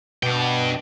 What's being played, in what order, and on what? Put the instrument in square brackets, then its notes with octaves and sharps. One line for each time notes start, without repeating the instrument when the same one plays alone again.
[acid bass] B2 [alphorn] B3 [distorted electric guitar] D4 G5